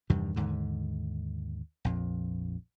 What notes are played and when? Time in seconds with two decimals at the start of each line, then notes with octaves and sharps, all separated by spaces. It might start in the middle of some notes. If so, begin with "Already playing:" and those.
0.10 E2 G2 C3 D#3
0.36 D#2 G#2 D3
1.85 A#1 F2